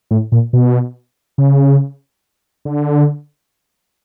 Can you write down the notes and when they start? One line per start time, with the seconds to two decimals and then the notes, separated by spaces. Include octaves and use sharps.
0.11 A2
0.32 A#2
0.53 B2
1.38 C#3
2.65 D3